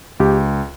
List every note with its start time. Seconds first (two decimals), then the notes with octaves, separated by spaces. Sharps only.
0.20 C#2 G4